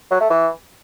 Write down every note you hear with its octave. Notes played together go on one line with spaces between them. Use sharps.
F#3
A3
E3